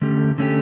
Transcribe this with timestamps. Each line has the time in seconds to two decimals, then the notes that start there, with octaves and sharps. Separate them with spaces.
0.01 D3 A3 C#4 G4
0.38 D3 A3 C#4 G4